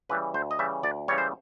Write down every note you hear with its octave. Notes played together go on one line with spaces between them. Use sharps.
C#3 E3 G3 B4
D2 C5
D#5
C#3 E3 G3 E5
D2 D5
C#3 E3 G3 C#5
C5